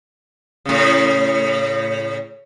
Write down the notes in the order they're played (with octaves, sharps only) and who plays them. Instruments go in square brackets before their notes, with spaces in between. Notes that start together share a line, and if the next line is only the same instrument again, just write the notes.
[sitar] A2 C#3